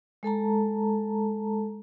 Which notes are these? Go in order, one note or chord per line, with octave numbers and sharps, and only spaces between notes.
G#3 A4 A5 A#5